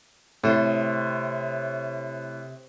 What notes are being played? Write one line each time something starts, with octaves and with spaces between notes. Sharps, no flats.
A2 C3 A4 C5